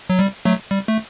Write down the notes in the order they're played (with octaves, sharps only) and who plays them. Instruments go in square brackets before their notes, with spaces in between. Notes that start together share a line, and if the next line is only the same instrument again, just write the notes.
[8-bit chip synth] F#3
G3
F#3 A3
G3
A3